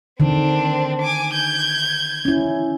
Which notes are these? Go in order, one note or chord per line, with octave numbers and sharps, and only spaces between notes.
D3 D#3 C4 D4
G#5 D6
G6 G#6
C#4 E4